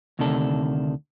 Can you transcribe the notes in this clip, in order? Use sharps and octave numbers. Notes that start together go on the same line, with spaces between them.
D2 C3 D#3 D4 A4